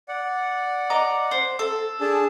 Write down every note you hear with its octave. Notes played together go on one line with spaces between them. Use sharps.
D5 F#5
D#5 A#5 D6
C5
A4
D4 G#4 A5